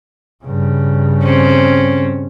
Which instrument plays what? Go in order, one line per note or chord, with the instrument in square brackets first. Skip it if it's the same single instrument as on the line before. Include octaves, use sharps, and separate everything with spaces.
[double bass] G2 C#3
[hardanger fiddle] C4 C#4